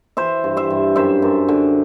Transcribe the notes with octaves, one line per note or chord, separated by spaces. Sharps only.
E3 C5 E5
G2
C5 E5
G2
F#2 C5 E5
F#2
D3